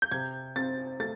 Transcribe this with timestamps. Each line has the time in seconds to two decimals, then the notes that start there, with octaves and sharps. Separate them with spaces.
0.02 G6
0.12 C3 G#6
0.56 C4 A6
1.00 A3 A6